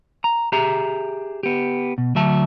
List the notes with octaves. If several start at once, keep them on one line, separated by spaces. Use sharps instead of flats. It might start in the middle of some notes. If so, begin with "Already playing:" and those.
A#5
G4 G#4 E5 A#5
B3 G4
B2
D2 F#3 E5 A5